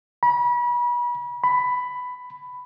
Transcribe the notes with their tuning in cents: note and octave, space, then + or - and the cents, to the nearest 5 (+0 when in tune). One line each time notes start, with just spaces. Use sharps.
B5 -35
B5 +10